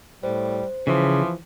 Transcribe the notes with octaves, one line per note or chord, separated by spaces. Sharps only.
A2 G3 C5
C#3 E3 F3